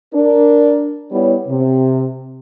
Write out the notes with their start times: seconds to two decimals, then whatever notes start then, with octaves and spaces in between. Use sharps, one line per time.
0.12 D4 A#4
1.11 G3 B3 E4 C#5
1.47 C3